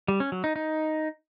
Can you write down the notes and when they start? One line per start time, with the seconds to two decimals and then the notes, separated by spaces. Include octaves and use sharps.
0.08 G3
0.20 C#4
0.32 F#3
0.44 D#4
0.56 D#4